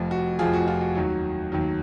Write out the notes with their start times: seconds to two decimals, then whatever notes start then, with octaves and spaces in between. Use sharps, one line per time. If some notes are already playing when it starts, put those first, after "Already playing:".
Already playing: F1 F2 F3
0.11 F#4
0.39 F1 F2 F3 F4 G#4
0.53 F#4
0.68 F4
0.81 F#4
0.95 D#2 D#3 F#3
1.52 D#2 D#3 F#3